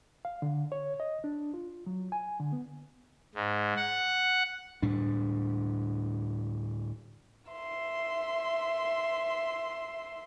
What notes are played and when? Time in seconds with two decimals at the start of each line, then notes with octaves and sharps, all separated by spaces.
0.25 F5
0.42 D3
0.72 C#5
1.00 D#5
1.24 D4
1.54 F4
1.86 F#3
2.12 G#5
2.40 D3
2.53 B3
3.35 G#2
3.77 F#5
4.82 D2 A2 G3 D4
7.51 E5 C6